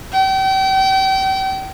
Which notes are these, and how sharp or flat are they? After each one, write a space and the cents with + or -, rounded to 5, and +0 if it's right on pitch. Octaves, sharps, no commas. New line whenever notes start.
G5 -35